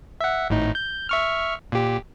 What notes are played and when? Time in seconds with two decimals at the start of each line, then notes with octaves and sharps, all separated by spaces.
0.20 E5 F#5
0.50 G#1 A2 D#4
0.75 G6
1.09 E5 C#6 F6
1.72 A#2 G4